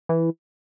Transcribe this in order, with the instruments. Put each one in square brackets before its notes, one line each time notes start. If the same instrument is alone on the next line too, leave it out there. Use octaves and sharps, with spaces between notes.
[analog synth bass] E3